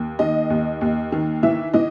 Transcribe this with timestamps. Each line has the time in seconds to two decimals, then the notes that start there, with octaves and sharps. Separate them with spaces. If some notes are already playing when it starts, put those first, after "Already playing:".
Already playing: D#2
0.19 D#3 D#5
0.50 D#2
0.81 D#2
1.12 D#3
1.43 E3 E5
1.74 E3 D#5